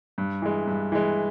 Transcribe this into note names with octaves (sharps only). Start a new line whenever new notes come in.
G2
E3 G#3
G2
E3 G#3